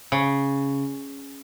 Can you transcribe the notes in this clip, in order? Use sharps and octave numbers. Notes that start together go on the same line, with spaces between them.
C#3